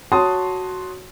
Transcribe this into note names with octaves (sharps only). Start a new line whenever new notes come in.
F#4 C#5 A5 C6 D#6